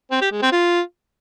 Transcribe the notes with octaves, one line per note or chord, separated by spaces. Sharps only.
C4
G4
G#3
C4
F4